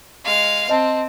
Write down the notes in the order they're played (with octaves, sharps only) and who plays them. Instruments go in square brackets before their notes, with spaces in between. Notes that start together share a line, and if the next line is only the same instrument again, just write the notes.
[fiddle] G#3 F5
[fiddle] C4 [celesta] D#5 A5